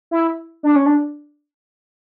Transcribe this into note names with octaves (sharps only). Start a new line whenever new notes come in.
E4
D4
C#4
D4